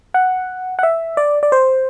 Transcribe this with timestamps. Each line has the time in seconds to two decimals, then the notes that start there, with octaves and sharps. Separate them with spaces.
0.14 F#5
0.79 F#5
0.83 E5
1.17 D5
1.43 D5
1.52 C5